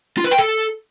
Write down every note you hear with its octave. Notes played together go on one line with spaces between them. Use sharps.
F4
B4
G5
A4